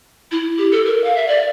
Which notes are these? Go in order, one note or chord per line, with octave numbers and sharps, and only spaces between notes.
E4
G4
A4
A#4
F5
E5
D5